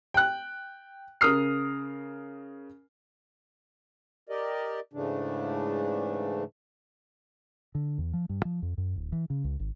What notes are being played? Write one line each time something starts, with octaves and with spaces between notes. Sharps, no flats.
G5 F#6
C#3 A#4 D#6 F6 C7
G4 A#4 D5 D#5
G#2 C#3 E3 A3 D4
D3
E2
F3
G2
F3
F2
F#2
D1
E3
C#3
C#2
G#1